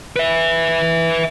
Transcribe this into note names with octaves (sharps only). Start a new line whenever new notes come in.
B4 E5